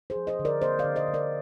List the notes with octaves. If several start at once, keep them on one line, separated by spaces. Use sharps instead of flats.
G#4 C5
F3
C5 D#5
D3
A#4 D5
A#3 C5 D#5
D5 F5
D3
C5 D#5
D3
A#4 D5